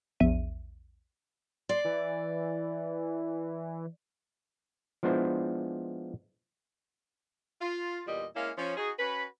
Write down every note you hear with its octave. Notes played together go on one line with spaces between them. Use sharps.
A#1 E2 E5 D#7
D5 C6
E3
F3 G#3 B3 D4 E4 C5
F4
E2 A#2 G3 F4 D#5
G#3 A#3 C#4 E4 F5
F3 C#4
D#4 F#4 G#4
C#4 F#4 B4